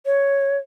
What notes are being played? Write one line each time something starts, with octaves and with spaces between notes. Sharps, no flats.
C#5